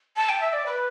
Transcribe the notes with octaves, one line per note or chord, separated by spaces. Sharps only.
A5
G5
E5
D5
B4